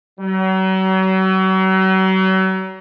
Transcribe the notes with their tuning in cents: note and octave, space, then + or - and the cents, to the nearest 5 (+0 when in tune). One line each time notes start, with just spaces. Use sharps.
F#3 +40